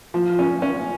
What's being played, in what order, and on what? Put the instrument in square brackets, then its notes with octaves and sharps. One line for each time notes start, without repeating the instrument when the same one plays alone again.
[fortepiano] F3
C#4
C#4